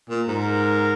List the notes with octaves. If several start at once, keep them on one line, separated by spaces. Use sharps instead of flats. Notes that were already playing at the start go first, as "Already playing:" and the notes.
A#2
G#2 A#4